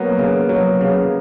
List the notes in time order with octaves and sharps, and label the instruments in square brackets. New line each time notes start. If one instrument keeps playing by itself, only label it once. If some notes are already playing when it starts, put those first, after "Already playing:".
Already playing: [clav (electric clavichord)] F#3 [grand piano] A#3 B3
[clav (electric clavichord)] C#3
F#3
C#3